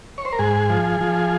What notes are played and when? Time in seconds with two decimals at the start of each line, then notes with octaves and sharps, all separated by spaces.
0.18 C#5
0.25 C5
0.33 A#4
0.39 G#2 G#4
0.70 F3
1.01 F3